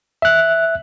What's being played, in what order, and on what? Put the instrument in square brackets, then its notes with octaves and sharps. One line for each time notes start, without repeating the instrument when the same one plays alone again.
[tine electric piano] E5 F#6